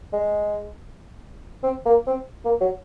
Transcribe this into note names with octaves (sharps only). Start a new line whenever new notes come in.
G#3
C4
A#3
C4
A#3
F#3